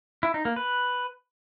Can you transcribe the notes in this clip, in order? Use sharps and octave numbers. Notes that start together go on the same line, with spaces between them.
E4
D#4
A#3
B4